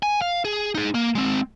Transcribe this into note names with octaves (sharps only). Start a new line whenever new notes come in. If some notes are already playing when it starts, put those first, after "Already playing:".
G#5
F5
G#4
D#4 G#4
A#3
G#3 C4